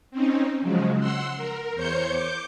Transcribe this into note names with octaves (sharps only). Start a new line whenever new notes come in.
C4 C#4 D#4
C#3 F3 F#3 G#3
F#5 C6 E6
A#4
E2 C5 C#5 G6 C#7
D6 G6